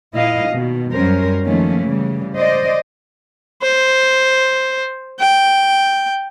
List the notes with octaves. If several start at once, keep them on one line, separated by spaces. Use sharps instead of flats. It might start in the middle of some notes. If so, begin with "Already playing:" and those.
A#2 E4 D#5 F5
B2 D#3
F#2 G3 C#4 A#4 C5
D#3 F3 A3 A#3 C#4
C#3 E3 G3
C5 D5 D#5
C5
G5